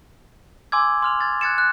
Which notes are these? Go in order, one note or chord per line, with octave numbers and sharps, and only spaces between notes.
G#5 C6 D6 E6 G#6
C6 F6 F7
G#6 A6
F#6 G#6 A6 C#7 E7
F#6